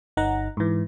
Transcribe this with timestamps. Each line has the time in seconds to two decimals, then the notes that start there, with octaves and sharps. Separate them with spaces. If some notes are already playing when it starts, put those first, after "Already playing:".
0.17 G1 D#4 F#5 A#5
0.57 G#2 E3